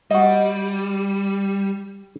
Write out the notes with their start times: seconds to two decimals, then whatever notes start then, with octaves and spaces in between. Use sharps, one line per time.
0.11 G3 F#4 D#5